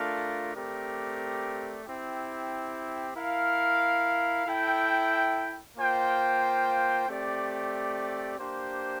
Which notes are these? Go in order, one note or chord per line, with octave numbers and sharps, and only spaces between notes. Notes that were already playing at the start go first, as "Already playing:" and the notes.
Already playing: A3 D4 F4 A#4 F5
A3 C4 G4 A#4 D5
C4 E4 G4
E4 A#4 F5
E4 A4 E5 G5
A#3 F4 C5 G5
A3 C4 G4 D5
A#3 D4 G4 C5